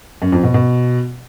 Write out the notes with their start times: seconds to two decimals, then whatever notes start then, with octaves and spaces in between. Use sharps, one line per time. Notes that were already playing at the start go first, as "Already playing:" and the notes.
0.22 F#2
0.32 F2
0.43 B2
0.54 B2